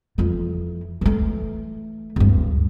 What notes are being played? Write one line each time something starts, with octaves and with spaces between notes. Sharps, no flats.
F2 E3
E3 A3
D1 G2